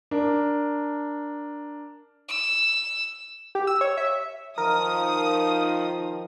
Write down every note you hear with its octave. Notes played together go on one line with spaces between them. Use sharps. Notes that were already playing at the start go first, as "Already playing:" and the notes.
D4 A#4
E6
G4
E6
C#5
E5
D#3 F3 A#4 D#6